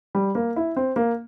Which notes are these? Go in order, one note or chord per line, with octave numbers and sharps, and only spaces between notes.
G3
A#3
E4
C4
A#3